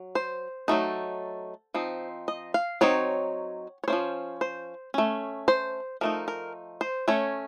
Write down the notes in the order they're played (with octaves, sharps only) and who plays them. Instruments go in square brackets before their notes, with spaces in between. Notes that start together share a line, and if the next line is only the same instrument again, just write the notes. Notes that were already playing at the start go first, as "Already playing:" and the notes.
Already playing: [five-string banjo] F#3
C5
F#3 A3 D#4
F3 C4 D#4
D#5
F5
F#3 C4 D#4 C#5
C#5
A#3 C#4 C5
F3
C5
A3 C#4
C5
F3 A3 D#4 A#4
A#4
C5
A3 C#4 C#5